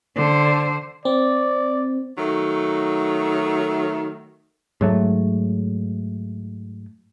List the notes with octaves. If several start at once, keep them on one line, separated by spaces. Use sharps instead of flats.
D3 C5
C4 D5
D#3 F#3 A3
G#2 F#3 A3